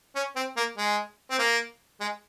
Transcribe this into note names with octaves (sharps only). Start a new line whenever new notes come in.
C#4
C4
A#3
G#3
C4
A#3
G#3